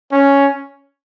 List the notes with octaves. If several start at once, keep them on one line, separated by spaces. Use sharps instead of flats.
C#4